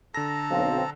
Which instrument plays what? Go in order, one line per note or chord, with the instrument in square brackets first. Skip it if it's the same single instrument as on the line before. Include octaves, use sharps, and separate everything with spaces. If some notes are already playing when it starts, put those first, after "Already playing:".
[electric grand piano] D3 A#6 [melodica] A4 A5 A#5
[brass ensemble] B1 C4 [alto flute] F5